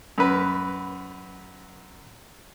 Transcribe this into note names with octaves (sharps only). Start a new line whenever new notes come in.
F#2 B4